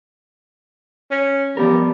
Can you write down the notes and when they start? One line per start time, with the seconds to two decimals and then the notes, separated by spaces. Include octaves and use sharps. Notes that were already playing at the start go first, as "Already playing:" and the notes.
1.11 C#4
1.57 F3 G3 B3 A#4